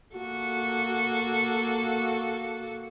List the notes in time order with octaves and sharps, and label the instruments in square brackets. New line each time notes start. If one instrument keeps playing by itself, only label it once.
[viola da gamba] A#3 F#4 A4